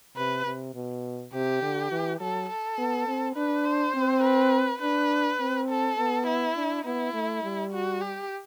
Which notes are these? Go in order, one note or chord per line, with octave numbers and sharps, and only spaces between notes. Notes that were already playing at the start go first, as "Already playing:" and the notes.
C3 B4
C3
B2
C3 G4
D3
E3
F#3 A4
A4
B3
C4
D4 B4
C5
C4
B4
D4 B4
C4
A4
B3
E4
D4
B3 E4
A3
G3
F#4
G4